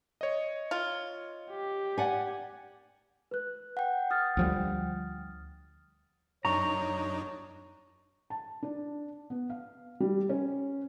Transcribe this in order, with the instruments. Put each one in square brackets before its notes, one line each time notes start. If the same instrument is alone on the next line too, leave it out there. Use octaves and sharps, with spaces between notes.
[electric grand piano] C#5 D#5
[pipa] F4
[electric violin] G4
[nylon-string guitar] D5 F#5 G#5
[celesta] B4 F#6
[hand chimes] F#5 G5
[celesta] D#6 F6 A6
[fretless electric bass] D2 F3 G3
[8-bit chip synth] F#2 D4 D#4 [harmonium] C#5 [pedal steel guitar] A#5 [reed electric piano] C#6
[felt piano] A5
D4
B3
F5
G3
C#4